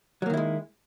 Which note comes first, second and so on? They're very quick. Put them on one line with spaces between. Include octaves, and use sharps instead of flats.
F#3 A#3 D#3 E4 G#3